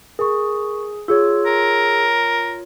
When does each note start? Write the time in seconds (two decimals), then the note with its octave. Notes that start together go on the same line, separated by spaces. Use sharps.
0.19 G#4 A#4 C#6
1.08 F4 G#4 C#5 E6
1.46 A#4